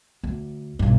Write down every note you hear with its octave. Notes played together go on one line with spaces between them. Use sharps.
D2
B1 G2